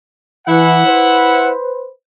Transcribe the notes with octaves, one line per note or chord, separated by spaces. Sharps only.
E3 E4 F#5
B4 C5